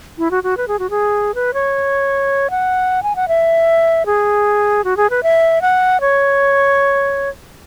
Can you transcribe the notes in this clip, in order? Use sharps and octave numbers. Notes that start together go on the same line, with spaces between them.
E4
F#4
F#4
B4
G#4
F#4
G#4
B4
C#5
F#5
G#5
F#5
E5
G#4
F#4
G#4
B4
E5
F#5
C#5